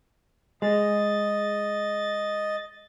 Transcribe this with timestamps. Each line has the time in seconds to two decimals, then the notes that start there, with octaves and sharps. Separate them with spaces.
0.62 G#3 D#5 A6